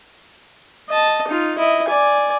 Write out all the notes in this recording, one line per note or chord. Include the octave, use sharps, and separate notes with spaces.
D#5 A5
D#4 F4
E4 D#5
D5 G#5